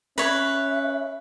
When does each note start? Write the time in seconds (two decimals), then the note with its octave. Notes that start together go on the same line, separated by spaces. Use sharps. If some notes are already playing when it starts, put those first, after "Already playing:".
0.18 C#4 B4 C#5 E5